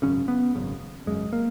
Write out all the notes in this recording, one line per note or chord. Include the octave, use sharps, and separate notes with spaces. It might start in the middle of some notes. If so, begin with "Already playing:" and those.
G#1 F#2 C#3 C#4
B3
G#1 F#2 C#3
G#1 F#2 C#3 G#3
A#3